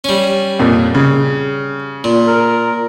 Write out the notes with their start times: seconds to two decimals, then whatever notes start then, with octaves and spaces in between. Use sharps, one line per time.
0.04 G3 C#4
0.59 F2 A#2
0.95 C#3
2.04 A#2
2.27 A#4